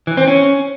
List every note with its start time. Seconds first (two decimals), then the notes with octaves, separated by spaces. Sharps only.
0.07 E3
0.17 C4
0.27 C#4